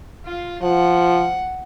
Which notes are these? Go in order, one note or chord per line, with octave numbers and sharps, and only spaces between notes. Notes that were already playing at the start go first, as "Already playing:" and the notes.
F4
F3 F#5